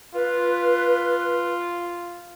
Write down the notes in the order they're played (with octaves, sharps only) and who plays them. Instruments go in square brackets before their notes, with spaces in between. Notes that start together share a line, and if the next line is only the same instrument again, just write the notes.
[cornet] F4 [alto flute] B4